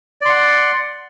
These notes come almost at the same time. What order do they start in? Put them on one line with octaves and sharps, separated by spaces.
D5 C6 F#5